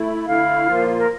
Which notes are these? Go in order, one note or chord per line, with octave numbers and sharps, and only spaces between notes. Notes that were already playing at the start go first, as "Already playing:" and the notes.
Already playing: A3 E4
D3 A3 E4 F5
A#2 F3 A#3 F4
A#4